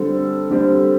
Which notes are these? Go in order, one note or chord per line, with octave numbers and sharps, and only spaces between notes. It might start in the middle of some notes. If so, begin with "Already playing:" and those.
Already playing: D3 G3 C4 A4
D3 G3 C4 G4